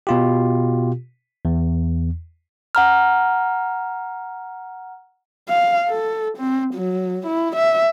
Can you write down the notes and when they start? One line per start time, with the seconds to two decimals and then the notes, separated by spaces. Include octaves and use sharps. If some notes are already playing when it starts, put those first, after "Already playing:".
0.07 B2 F4 G4
1.45 E2
2.75 F#5 A#5 F6
5.49 F5
5.89 A4
6.37 C4
6.74 F#3
7.27 E4
7.56 E5